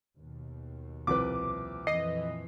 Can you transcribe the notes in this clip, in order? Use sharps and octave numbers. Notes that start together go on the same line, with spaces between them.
D#2 B2
C2 F3 B4 D6
F2 A#2 E3 D#5 C7